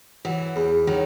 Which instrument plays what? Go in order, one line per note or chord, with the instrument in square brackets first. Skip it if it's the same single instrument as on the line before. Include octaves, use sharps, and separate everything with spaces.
[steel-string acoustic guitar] E3 [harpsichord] F#3
[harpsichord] E2
[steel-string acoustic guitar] D#3 [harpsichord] F#3